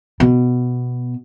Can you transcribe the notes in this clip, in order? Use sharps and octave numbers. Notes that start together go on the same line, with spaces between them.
B2